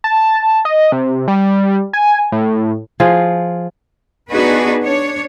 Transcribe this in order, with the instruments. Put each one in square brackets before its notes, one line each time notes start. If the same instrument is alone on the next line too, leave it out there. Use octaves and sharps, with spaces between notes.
[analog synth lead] A5
D#5
C3
G3
G#5
A2
[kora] F3 F4 G#4
[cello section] B3 D4 D#4 F#4 G#4 B4
D4 C#5